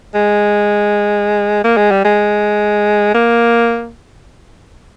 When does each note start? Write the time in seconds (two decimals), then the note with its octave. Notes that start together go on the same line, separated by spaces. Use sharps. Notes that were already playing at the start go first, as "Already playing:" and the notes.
0.15 G#3
1.64 A#3
1.77 G#3
1.91 G3
2.05 G#3
3.14 A#3